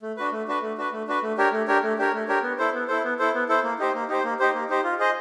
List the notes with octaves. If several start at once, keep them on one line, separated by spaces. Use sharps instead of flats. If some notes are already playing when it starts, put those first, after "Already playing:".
A3
D4 F#4 B4
A3
D4 F#4 B4
A3
D4 F#4 B4
A3
D4 F#4 B4
A3
D4 G4 A#4 C#5
A3
D4 G4 A#4 C#5
A3
D4 G4 A#4 C#5
A3
D4 G4 A#4 C#5
B3
E4 A4 C5
B3
E4 A4 C5
B3
E4 A4 C5
B3
E4 A4 C5
A#3
D#4 G4 C5
A#3
D#4 G4 C5
A#3
D#4 G4 C5
A#3
D#4 G4 C5
F4
G#4 C5 D#5